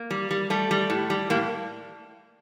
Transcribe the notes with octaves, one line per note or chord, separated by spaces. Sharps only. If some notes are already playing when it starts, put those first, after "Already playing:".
Already playing: A#3
G3
G3
G3 A3
G3
A2
G3
A2 A#3